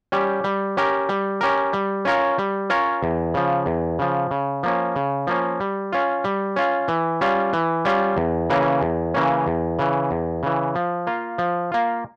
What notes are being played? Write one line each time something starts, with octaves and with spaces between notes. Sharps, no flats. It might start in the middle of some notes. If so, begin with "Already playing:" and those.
G3 C#4 G4
G3
C#4 G4 A#4
G3
C#4 G4 A#4
G3
C#4 F4 A#4 C#5
G3
C#4 F4 A#4 C#5
E2
C#3 F3
E2
C#3 F3
C#3
F3 A#3 C#4
C#3
F3 A#3 C#4
G3
C#4 F4
G3
C#4 F4
E3
G3 C#4 F4
E3
G3 C#4 F4
E2
C#3 E3 A#3 C#4
E2
C#3 E3 A#3 C#4
E2
C#3 E3
E2
C#3 E3
F3
A#3 F4
F3
A#3 F4